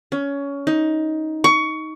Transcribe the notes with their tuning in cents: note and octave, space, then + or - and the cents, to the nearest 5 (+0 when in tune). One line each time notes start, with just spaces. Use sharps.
C#4 +20
D#4 +15
C#6 +20